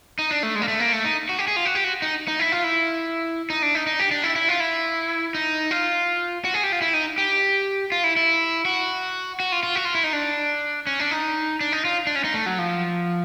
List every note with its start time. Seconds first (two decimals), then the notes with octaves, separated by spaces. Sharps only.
0.19 D#4
0.31 D4
0.43 A3
0.55 G#3
0.62 A#3
0.68 A3
0.79 A#3
0.93 A3
1.04 D#4
1.29 F#4
1.39 G4
1.48 G#4
1.56 F4
1.65 F#4
1.75 G4
1.84 F#4
2.02 D#4
2.28 D#4
2.39 E4
2.52 F4
2.64 E4
3.50 D#4
3.62 D4
3.75 D#4
3.87 D#4
3.99 G4
4.11 D4
4.23 E4
4.36 E4
4.49 F4
4.60 E4
5.35 D#4
5.71 F4
6.45 F#4
6.54 G#4
6.64 G4
6.72 F4
6.81 E4
6.94 D#4
7.18 G4
7.92 F4
8.04 E4
8.16 E4
8.65 F#4
9.40 F#4
9.52 F4
9.63 F4
9.76 F#4
9.85 F4
9.95 E4
10.04 D#4
10.13 D4
10.87 C#4
10.99 D4
11.11 D#4
11.61 D4
11.72 D#4
11.85 F4
12.07 D4
12.16 C#4
12.24 D#4
12.34 A3
12.46 F#3
12.58 F3